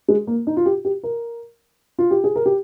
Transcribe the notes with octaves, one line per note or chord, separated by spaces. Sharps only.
G#3
A#3
D#4
F4
G4
G4
A#4
F4
G4
G#4
A#4
G4